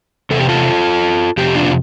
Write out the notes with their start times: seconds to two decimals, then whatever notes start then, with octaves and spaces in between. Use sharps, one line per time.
0.30 E2 C3 A4
0.39 G4
0.48 F4 A4
1.37 F2 C3 G4
1.55 D4 F4